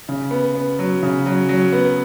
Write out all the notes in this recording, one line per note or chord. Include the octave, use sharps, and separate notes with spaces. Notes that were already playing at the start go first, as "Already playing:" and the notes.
C#3
B3
B3
F#3
C#3
F#3
F#3
B3